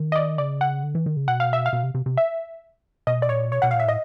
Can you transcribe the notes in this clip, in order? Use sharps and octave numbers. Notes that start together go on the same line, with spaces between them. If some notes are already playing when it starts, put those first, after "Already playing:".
Already playing: D#3
D#5
D5
C#3 D5
F#5
D3
E3
D#3
C#3
B2 F#5
F5
E5
F5
B2
C3
C3
C3
E5
B2 D#5
D5
A#2 C#5
B2 C#5
B2 F#5
A#2 F5
E5
A2 D#5